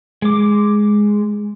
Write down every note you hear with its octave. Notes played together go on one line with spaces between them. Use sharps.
G#3 D6